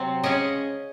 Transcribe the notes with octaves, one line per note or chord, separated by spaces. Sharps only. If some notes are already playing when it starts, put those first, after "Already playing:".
Already playing: C3 F#3 C4
C#3 G#3 C#4 D#5